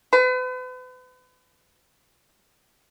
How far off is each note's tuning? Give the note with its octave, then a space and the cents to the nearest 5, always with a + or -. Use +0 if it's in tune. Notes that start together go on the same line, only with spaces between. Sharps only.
B4 +40